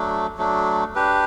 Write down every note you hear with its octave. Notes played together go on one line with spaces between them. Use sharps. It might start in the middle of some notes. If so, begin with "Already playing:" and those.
Already playing: F#3 A3 D4
F#3 A3 D4
D4 G4 B4